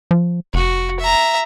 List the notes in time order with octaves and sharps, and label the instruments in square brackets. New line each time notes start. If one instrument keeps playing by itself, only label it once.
[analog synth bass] F3
[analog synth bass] F1 [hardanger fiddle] F#4
[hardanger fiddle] E5 A#5